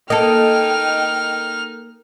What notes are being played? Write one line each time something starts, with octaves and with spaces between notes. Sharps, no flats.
A#3 D#4 A4 D#5 G5 F6